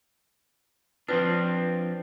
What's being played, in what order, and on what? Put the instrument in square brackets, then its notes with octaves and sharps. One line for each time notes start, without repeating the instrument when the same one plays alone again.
[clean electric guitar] F3 C4 D4 [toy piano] F4 B4 D#6